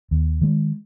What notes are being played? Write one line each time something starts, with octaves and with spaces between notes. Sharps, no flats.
D#2
D#3 G#3